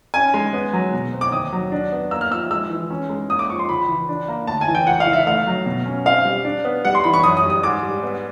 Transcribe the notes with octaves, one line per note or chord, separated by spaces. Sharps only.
C#4 G#5
G#3
B3
F#3
B2
C4
D6
D#2 D#6
F#3
D4
B3
A#3 E6
F6
F3 E6
G#3 E6
E3
C#4
G#3
A#3 D#6
D6
F3 C#6
C6
C#2 B5
E3
D4
A#3
D2 A5
G#5
E3
G5
C#2 F#5
F5
E3
E5
A3 F5
F#3
B2
C#4
C4 F5
G3
D4
B3
G3 F#5
C6
E3 B5
C#6
F#2 D#6
D#6
G3
D#6
G#2 D6
G3
B3